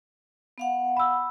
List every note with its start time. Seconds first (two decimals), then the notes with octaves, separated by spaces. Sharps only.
0.58 B3 F5 F#5
0.97 B5 E6